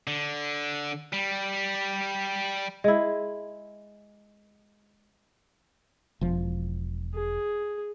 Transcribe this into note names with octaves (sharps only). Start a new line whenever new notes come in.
D3
G3
G#3 E4
E1 F3
G#4